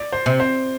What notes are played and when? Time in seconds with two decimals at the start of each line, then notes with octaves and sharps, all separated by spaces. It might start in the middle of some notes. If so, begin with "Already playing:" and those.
Already playing: D5
0.12 C5
0.26 C3
0.40 C5